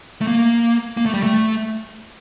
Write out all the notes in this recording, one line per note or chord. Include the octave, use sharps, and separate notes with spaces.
A3
A#3
A#3
A3
G3
A3